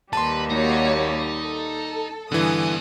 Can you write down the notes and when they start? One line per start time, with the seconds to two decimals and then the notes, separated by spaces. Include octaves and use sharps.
0.13 D#2 G3 B4 A5 C6
0.50 A#3 D#4 F#4 C#5
1.44 A4
2.32 G2 D3 E3 B3 G#5 D#6